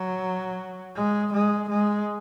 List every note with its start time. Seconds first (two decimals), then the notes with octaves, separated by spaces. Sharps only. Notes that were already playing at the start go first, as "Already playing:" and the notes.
Already playing: F#3
0.96 G#3
1.33 G#3
1.69 G#3